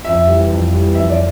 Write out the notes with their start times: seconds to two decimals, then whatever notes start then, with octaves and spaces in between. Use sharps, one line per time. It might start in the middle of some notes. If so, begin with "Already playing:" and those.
0.05 F2 E5
0.27 E3 G3
0.51 F2
0.72 E3 G3
0.95 F2 E5
1.10 D5